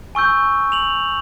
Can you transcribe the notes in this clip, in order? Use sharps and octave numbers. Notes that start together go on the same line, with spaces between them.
G#5 C#6 E6 G6
F7 F#7